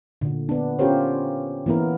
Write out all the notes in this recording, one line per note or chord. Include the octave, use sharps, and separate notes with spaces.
A#2 D3
B3 D4
C#4 F4 G4 A#4 C5 C#5
E3 A#3 B3 E4 A#4